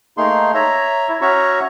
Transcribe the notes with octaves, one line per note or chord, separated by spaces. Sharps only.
A3 A#3 D#4 G#4 C6
C#5 E5 A#5
E4
C#4 F#4 C#5 E5 A#5 C#6